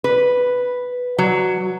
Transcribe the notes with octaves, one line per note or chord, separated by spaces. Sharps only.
B4
F#3